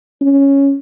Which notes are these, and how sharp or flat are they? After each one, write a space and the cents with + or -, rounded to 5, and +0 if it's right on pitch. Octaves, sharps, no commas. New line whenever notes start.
C#4 +0